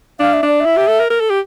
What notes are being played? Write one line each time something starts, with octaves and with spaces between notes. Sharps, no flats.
D4 F5
E5
D4 D5
E5
E4
G4
A4
A#4
A#4
A4
G4